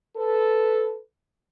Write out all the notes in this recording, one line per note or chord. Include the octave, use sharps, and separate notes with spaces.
A4 B4